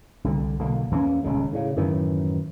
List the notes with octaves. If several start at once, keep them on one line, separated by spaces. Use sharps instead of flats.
C2 D3
B1 D3 A#3
E2 E3 A#3 C#4
D#1 C#2 C#3
A2 C#3
F#2 A2 D#3 E3